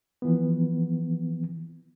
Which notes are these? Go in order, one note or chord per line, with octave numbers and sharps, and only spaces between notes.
E3 F3 B3